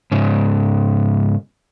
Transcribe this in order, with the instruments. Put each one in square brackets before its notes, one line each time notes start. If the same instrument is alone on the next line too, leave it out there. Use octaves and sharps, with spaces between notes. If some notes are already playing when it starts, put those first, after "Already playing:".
[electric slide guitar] G#2 C#3